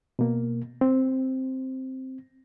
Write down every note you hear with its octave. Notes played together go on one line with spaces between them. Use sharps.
B2 A#3
C4